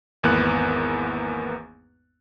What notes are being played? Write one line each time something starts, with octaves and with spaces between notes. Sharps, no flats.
G#1 E2 A#3 B3 F#6